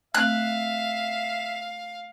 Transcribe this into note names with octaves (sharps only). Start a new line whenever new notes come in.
A3 C4 E5 F5 F#6